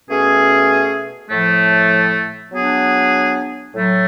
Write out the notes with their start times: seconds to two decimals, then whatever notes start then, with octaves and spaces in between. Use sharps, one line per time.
0.09 B2 A3 C#4 G#4
1.30 A2 F3 A3
2.51 F#3 B3 D4 G#4
3.74 A2 F#3 A3